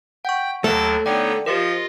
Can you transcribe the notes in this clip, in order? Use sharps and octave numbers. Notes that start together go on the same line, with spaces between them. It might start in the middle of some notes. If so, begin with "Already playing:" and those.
F#5 G5 C#6 G6
D#2 F#3 A3 A4 A#4
D3 B3 D#4 C#5 D5 G5
F3 F4 G4 A#4 D#5